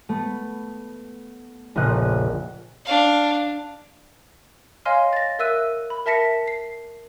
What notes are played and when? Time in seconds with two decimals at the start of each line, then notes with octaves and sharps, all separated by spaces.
0.09 A3 B3
1.75 F1 A#1 A#2 C#3 D#5 F#6
2.85 D4 F5
4.85 C#5 D#5 F5 G#5 C6 F6
5.13 A6 A#6
5.39 A#4 E5 E6 F#6 D#7
5.90 B5
6.06 A#4 E5 A5 A#6 B6 C#7
6.48 C7